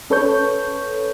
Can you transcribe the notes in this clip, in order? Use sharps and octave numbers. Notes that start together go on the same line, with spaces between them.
C#4 A4 B4 C#5 C#6 G6